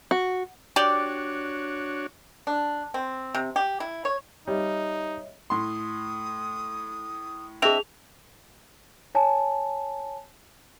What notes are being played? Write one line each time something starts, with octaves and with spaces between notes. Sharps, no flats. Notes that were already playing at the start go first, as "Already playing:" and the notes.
F#4
D4 F#4 G4 C#5 D5
D4
C4
C3
G4
E4
C#5
G3 D#4 C#5 D#5 E5
A2 C6 D#6
C4 D4 G#4 D#5 E5 F7
C#5 G#5 A5